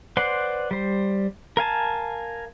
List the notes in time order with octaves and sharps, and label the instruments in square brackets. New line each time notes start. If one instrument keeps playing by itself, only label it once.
[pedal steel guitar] B4 C5 D5 F#5 C6
G3 C5
A#4 F5 G#5 A5